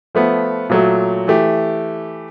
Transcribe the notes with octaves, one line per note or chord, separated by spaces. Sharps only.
F3 A3 B3
A#2 F#3 A3
E3 A3 G4